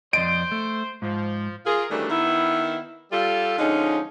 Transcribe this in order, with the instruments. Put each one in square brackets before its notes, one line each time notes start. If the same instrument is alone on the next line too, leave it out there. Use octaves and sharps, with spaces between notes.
[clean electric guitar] F2 D5 D#5 [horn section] C5 [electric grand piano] D7
[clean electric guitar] A3
[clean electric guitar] G#2 [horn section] F3
[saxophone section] F4 G#4 A#4
D#3 E3 F#3 G3 A3 D4
D#3 B3 E4
G3 F4 A4
D3 F3 G#3 C#4 D#4